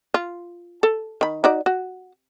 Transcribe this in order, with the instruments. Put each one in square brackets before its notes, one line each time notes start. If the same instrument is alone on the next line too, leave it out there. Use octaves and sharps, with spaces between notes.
[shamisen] F4
A4
D#3 B5
D#4 F#4 D5
F#4